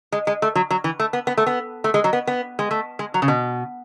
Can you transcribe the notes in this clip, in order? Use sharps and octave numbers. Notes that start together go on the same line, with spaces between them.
G#3
G#3
A3
F#3
F#3
E3
A3
B3
B3
A3
B3
A3
G#3
F#3
B3
B3
G#3
A3
G#3
F#3
C#3
B2